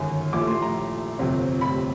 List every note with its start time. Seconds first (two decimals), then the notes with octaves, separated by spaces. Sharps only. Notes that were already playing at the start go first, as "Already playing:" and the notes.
Already playing: G1 F#2 D#3 G#3
0.33 A#1 A2 F3 A3 D6
0.47 C6
0.62 A#5
1.19 G1 F2 C3
1.61 B5